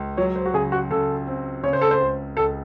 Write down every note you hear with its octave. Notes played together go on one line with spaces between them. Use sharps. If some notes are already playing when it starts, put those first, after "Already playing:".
Already playing: C#2
F#3 C#5
C5
F#4
C#3 G#4
F#4
C#3 A4
C4
C#3 C#5
C5
A4
C5
C#2
C#2 A4